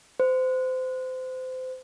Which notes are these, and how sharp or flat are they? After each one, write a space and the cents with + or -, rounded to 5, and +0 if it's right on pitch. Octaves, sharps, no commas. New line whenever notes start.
C5 -30